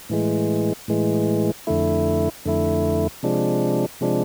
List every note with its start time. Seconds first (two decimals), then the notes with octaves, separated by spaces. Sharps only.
0.09 A2 E3 G#3
0.88 A2 E3 G#3
1.67 F2 D3 A3 E4
2.45 F2 D3 A3 E4
3.23 C3 F3 G#3 D4
4.01 C3 F3 G#3 D4